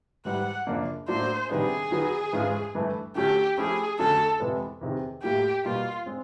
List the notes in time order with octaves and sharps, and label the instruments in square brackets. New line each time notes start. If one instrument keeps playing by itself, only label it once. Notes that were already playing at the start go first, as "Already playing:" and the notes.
[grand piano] G#2 E3 G3 [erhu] F#5
[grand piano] F#2 C#3 F3 A#3 D4
[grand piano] A2 F#3 A#3 D4 [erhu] C5
[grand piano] C3 D#3 G3 B3 D4 [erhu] G#4
[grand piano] D#3 F#3 B3
G#2 E3 G#3 C#4 F4
G2 E3 A3
[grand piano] D3 F#3 A3 C#4 [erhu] G4
[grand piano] F3 A3 C#4 E4 G4 [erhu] G#4
[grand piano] F2 D3 F#3 A3 C#4 [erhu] A4
[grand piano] F2 C3 E3 G#3 B3
E2 C3 D#3
[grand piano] A2 F#3 A#3 [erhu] G4
[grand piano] B2 G3 A#3 [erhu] F4
[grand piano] G#3 C4